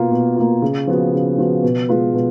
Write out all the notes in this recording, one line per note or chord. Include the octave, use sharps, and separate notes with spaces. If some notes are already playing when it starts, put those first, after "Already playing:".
Already playing: B2 A#3 F4
B2
A#3 F4
C#3
F3 B3 F#4
C#3
F3 B3 F#4
B2
G#3 B3 F4 B4
B2